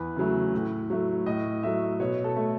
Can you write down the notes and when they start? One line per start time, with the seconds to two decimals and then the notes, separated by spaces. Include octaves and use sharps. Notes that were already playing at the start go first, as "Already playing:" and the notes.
Already playing: E2 B4
0.16 C#3 F#3 A3
0.53 A2
0.90 F#3 A3
1.26 A2 D#5
1.63 F#3 A3 E5
2.00 B2 C#5
2.24 A4
2.36 A3